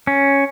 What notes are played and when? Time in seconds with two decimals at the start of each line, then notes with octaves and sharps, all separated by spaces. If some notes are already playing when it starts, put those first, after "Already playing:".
0.07 C#4